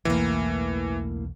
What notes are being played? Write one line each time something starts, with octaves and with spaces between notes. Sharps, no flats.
B1 E2 A2 E3 A#3